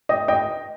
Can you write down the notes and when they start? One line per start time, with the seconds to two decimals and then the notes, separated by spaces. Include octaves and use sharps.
0.09 D#5 G5
0.28 D#5 G5